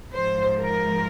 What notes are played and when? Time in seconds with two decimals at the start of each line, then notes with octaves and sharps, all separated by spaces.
0.14 G#2 F3 C5
0.59 A#4